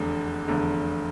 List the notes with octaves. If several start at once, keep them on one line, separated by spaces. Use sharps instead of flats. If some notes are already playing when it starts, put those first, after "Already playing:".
Already playing: F1 E2 D3
F1 E2 D3